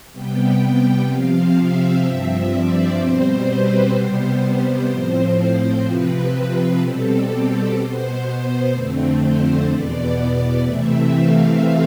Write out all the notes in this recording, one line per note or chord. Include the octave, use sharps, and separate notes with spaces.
C3 G3 B3 G5
G5
C3 F3 C4 F5
E5
G2 F3 C4
D5
B2 G3 C4 C5
B4
C3 G3 B3 C5
C5
A2 F3 C4
C5
C3 F3 C4 B4
B2 G3 C4 A4
G4
B2 B3 C5
F2 D3 A3 C4
C5
E2 B2 B3 D5
D5
C3 E3 A3 C4 E5
F5